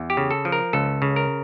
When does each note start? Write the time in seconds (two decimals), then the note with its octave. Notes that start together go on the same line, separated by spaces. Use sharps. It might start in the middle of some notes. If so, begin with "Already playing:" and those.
Already playing: E2
0.10 G4
0.17 C#3
0.31 A4
0.45 F3
0.52 A#4
0.73 C#2 A4
1.02 C#3
1.16 A#4